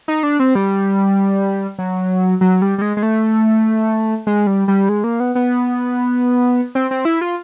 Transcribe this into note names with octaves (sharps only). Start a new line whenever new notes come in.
D#4
D4
C4
G3
F#3
F#3
G3
G3
G#3
G#3
A3
G#3
G3
G3
G#3
A#3
B3
B3
C4
C4
E4
F4